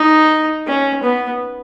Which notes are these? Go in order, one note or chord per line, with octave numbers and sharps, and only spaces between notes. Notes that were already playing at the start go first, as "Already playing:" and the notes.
Already playing: D#4
C#4
B3